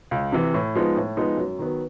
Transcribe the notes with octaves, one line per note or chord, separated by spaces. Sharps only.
C#2
C3 E3
A2
F3 G#3 B3 D#4
A2
F3 G#3 B3 D#4
F#2
D#3 F#3 B3